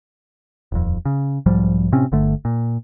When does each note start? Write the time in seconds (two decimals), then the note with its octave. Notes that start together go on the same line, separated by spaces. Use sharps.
0.72 D#1 F2
1.05 C#3
1.46 B1 G#2 F3 G3
1.92 A2 C3 C4 C#4
2.12 G1 D3 A3
2.45 A#2